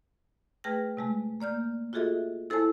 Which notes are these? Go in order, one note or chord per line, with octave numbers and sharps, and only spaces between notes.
A3 G#4 B4 G5 F6 A#6
C3 G#3 A3
A#3 D5 F6 G6
F4 F#4 G#4 A4 D#5 E5
E4 A4 C5 G#5 A5